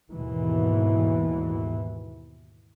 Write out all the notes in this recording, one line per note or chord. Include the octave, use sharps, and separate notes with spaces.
D#2 G#2 B2 E3